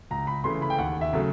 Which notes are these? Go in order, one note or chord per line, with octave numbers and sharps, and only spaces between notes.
C#2 A#5
B5
C#3 E3 A3 C6
B5
G5
D#2 F#5
E5
C#3 F#3 A3